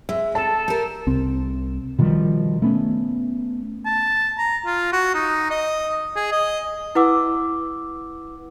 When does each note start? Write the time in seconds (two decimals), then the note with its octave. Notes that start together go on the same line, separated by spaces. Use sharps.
0.09 G#3 E5
0.35 A4 A5
0.68 G4 A#4
1.07 C2 C4
1.99 B2 D#3 F3 G3
2.62 A3 B3 C#4
3.86 A5
4.38 A#5
4.66 F4
4.93 F#4
5.15 D#4
5.51 D#5
6.16 G#4
6.32 D#5
6.95 E4 B4 F#5 D6 E6